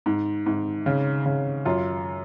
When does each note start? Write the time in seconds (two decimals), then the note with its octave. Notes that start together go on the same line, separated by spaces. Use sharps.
0.06 G#2
0.46 G#2
0.86 C#3
1.26 C#3
1.65 F#2 F4